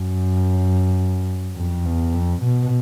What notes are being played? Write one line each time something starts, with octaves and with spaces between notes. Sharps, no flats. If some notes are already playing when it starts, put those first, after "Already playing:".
Already playing: F#2
F2
E2
F2
B2